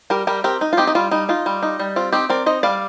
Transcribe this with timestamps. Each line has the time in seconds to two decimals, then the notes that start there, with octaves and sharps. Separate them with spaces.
0.10 G3 G4 A#4
0.27 G3 G4 A#4
0.44 C4 G4 A#4
0.61 D#4
0.73 F4
0.77 C4 D#4 G4
0.87 D#4
0.95 G3 F4
1.11 G3 D#4
1.29 D#4 F4
1.46 G3
1.63 D#4
1.79 G3
1.96 C4 F4
2.12 C4 D#4 G4
2.29 C4 A#4 D5
2.46 D#4 C5 D#5
2.63 G3 D5 F5